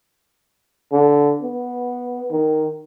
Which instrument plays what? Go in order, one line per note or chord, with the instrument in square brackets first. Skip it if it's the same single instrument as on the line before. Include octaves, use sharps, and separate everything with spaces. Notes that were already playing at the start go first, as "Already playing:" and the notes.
[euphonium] D3
B3
D#3